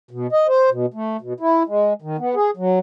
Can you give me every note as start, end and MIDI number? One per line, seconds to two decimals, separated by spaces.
0.11 0.27 47
0.32 0.47 75
0.48 0.70 72
0.71 0.86 47
0.94 1.17 57
1.21 1.33 47
1.40 1.63 64
1.67 1.93 56
2.02 2.17 51
2.18 2.35 59
2.35 2.51 68
2.57 2.79 54